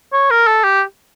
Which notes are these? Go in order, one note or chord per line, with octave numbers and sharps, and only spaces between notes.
C#5
A#4
A4
G4